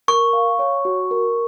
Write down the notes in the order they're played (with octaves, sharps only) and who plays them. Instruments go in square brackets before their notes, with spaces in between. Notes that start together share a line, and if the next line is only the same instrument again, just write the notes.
[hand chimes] A#4 [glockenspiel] C#6
[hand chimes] F5
C#5
F#4
A#4